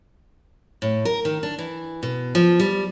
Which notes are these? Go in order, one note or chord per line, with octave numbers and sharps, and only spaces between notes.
A2
A#4
D#3
D4
E3
B2
F3
G3